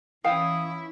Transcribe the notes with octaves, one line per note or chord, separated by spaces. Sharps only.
E3 C#4 E4 F5 G5 D#6